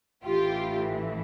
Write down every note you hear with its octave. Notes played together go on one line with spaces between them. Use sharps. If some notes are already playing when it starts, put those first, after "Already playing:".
A1 A2 E3 F4 G4